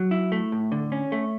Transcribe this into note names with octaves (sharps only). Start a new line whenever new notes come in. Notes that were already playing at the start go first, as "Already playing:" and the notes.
Already playing: F#3
E4
A3
A2
D3
C#4
A3